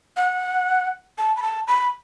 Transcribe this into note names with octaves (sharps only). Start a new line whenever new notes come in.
F#5
A5
B5
A5
B5